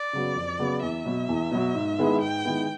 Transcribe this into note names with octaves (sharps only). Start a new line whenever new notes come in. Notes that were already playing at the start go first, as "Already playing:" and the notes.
Already playing: D5
C#3 F#3 B3
F2
C#3 F#3 B3
E2 E5
B2 F#3
E2
B2 F#3
G#2
D#3 G#3 B3 E4
G#2 G5
D#3 G#3 B3 E4